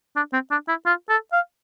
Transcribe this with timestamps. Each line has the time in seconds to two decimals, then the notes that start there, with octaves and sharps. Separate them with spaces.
0.16 D4
0.33 C4
0.51 D4
0.68 E4
0.86 F4
1.09 A4
1.33 F5